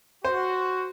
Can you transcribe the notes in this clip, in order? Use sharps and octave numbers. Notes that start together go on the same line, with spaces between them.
F#4 C5